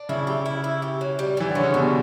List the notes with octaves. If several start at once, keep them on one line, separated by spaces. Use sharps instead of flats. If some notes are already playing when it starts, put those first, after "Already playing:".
Already playing: D4
C#3 E4
G4
E4
E4
G4
F#3
G3
E3 G3
D3 C#4
C#3
B2 G3